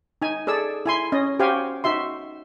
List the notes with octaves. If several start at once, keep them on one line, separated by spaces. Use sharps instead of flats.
D#4 G#5
G#4 A4 D5 E6
E4 G#5 C6
C#4 D#5
F#4 G4 C5 F5 G5 G#5
D#4 F#4 E5 C6